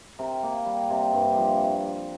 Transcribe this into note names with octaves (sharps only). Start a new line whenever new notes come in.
C3 A#4
A#3
G3
C3
G2
F3